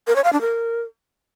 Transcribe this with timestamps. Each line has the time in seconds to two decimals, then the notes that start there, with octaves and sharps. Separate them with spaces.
0.07 A#4
0.16 C#5
0.24 F5
0.33 D4
0.41 A#4